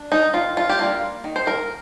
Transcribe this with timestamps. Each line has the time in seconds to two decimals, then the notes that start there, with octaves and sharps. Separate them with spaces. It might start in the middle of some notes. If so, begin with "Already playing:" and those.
Already playing: D4
0.12 D#4
0.33 D#3 F4
0.57 F4
0.69 G4
0.79 G3 A#3 D4 F4
1.24 D#3
1.36 C5
1.47 A#4